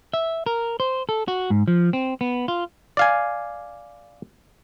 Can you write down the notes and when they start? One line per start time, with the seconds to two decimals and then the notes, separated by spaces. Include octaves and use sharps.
0.13 E5
0.46 A#4
0.80 C5
1.09 A4
1.28 F#4
1.50 G#2
1.68 F3
1.93 C4
2.21 B3
2.48 F4
2.97 D5 F5 G#5